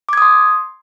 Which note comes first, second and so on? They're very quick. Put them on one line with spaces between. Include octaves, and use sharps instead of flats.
D6 G#6 D#6 C6